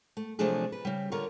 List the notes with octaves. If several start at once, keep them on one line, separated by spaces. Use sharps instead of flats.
A3
C3 F3 F#3 A3 D4 G#4
B4
C#3 G3
D3 F4 A#4 C#5